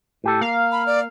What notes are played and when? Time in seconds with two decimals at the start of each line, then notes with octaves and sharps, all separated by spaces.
0.24 A2 G4 A4
0.41 A#3 F5
0.72 B5
0.87 D5